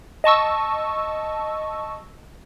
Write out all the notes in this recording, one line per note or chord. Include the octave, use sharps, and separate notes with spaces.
D#5 A5 C#6 E6